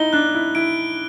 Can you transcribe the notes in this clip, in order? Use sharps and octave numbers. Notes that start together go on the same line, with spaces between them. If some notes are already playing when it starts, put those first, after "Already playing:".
Already playing: D#4 E4 G7
D4 F#6
E4
E4 D7